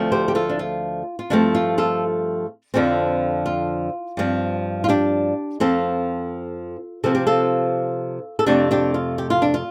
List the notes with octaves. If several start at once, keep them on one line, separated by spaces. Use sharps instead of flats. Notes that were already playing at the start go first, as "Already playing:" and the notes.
Already playing: D2 F3 A3 C4
G4 C5
G4
F4 A4
D4
F4
F4
G2 F3 A3 C4 D4
F4
F4 A4
F2 D3 F3 C4
F4
G2 F3 C4
F4
D4 G4
F2 F3 C4 F4 A4
C3 F3 C4 A4
G4
F4 A4
A4
F2 C3 A3 D4 G4
D4 G4
F4
G4
F4
D4
F4